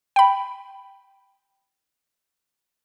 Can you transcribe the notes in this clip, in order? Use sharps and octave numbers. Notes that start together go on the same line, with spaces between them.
G5 B5